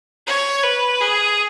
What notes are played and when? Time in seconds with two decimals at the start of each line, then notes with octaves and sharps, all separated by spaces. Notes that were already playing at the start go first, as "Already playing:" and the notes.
0.27 C#5
0.63 B4
1.01 G#4